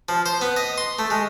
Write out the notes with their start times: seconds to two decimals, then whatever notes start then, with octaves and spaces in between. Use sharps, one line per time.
0.09 F3
0.26 C5
0.41 B3
0.56 D#5
0.78 C6
0.99 A3
1.10 G#3